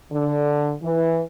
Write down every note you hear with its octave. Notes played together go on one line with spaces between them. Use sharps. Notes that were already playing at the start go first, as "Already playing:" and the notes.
D3
E3